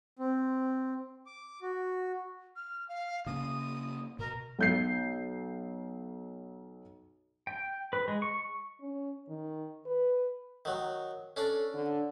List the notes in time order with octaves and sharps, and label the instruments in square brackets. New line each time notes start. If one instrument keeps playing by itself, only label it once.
[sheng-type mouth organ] C4
D6
F#4
[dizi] F6
F5
[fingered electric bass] C#3 A#3 [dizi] D#6
[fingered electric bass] B2 [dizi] A#4
[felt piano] B1 G6 C7
[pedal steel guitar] G5
B4
G#3
C#6
[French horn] C#4
D#3
B4
[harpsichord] D#3 F#3
[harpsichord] C#4 D4 D5 [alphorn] A4
[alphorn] D3